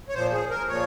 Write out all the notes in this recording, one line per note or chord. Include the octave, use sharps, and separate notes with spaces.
C#5
A#2 F3 C5
G#4
A#4
A#2 F3 C#5